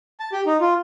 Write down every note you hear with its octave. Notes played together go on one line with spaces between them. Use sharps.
A5
G4
D#4
F4